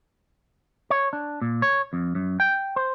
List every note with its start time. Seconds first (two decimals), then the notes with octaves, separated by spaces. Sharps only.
0.90 C#5
1.13 D4
1.42 A#2
1.62 C#5
1.93 F2
2.15 F#2
2.40 G5
2.76 C5